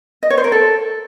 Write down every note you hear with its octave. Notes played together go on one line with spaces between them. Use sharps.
D#5
C#5
C5
A#4
A4